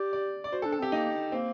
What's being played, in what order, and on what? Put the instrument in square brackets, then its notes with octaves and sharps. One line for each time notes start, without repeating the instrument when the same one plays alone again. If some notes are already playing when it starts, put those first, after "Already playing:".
Already playing: [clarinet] G4 [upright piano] D5
[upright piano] D5
D5
[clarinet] F#4 [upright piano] C5
[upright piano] A4
[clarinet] D4
[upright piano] A4
[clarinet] C4 [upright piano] G4
[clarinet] A#3 [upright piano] D#4
[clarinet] A#3 [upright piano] C4